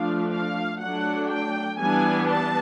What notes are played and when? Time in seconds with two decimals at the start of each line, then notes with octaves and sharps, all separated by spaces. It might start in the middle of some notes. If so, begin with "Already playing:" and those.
Already playing: F3 A3 D4 F5
0.31 F5
0.80 F#3 A3 D4 F#5
1.30 G5
1.79 E3 G3 B3 D4 G#5
2.29 A5